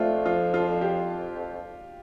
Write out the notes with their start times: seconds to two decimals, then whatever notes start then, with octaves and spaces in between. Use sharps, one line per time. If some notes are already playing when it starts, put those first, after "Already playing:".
Already playing: F2 A3 D4 F4
0.25 F3 F4
0.54 F4
0.67 F2
0.81 G4